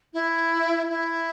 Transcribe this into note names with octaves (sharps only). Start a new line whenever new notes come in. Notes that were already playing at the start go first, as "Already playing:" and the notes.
E4
E4